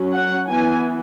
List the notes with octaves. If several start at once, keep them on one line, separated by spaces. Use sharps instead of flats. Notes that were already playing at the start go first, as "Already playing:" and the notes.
Already playing: F#3 C#4
F#5
E3 B3 G#5